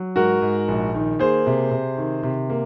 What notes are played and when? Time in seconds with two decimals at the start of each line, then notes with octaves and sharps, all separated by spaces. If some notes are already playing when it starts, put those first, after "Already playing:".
Already playing: F#3
0.16 G#2 F#4 A#4
0.42 G#2
0.68 A#1
0.94 D#3
1.19 A#3 G#4 C5
1.47 C3
1.71 C3
1.97 D#3
2.23 C3
2.50 A#3